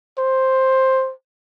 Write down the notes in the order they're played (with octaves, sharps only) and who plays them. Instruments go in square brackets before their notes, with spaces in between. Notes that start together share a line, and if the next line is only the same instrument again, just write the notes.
[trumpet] C5